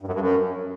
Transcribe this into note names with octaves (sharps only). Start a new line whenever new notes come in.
G2
F#2
G2
F#2